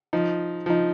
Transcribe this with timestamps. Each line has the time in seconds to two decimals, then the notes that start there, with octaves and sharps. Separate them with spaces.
0.13 F3 D#4
0.66 F3 D#4